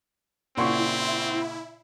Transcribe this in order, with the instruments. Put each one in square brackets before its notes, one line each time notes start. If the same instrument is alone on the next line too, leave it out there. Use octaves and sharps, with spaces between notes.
[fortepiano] A#2 C#3 [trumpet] C4 [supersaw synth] E4 [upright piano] F#5 C6 C#6